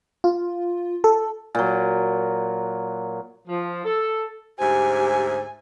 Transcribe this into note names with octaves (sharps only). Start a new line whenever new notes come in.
F4
A4
A#2 F#3
F3
A4
D2 G#2 G4 C5 E5 G#5